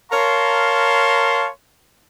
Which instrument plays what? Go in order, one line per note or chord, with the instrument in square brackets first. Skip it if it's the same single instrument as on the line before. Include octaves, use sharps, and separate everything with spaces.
[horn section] A#4 C#5 F5 A5 A#5 C6